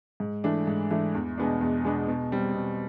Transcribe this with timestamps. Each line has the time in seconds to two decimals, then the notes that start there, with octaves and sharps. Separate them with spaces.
0.20 G#2
0.44 E3 A3 D4
0.67 G#2
0.90 E3 A3 D4
1.15 E2
1.38 B2 G#3 B3 D4
1.61 E2
1.85 B2 G#3 B3 D4
2.08 B2
2.32 G3 C4
2.54 B2